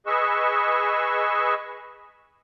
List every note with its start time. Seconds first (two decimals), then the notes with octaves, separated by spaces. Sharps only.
0.07 G#4 B4 D#5 C#6 E6